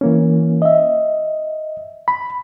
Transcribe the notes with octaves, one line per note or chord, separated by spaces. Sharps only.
E3 A#3 C#4
D#5 E5
B5